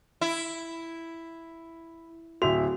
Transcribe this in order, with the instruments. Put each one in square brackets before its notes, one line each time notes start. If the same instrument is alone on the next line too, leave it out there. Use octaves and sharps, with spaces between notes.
[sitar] E4
[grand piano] D1 E5 F7 [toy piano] F#4